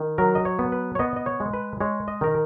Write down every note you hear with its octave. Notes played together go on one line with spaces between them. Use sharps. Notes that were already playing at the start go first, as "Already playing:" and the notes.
Already playing: D#3
F#3 A#4
D#5
C#5
B3
B4
C#5
B3 D#5
D#5
C#5
G#3
B4
G#3 C#5
D#5
D#3 A#4